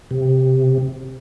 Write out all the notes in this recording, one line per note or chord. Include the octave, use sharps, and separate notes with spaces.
C3